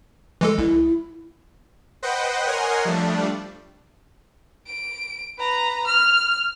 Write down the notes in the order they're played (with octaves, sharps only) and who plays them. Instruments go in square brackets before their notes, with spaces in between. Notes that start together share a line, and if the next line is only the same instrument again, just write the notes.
[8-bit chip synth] E3 G#3 A4
[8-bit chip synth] C2 [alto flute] E4
[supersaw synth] B4 C5 D#5 F#5 G5
A#4 C#5 D#5 F#5 G#5 C6
F3 G3 A3 D4
[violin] D7
B4 A#5
F6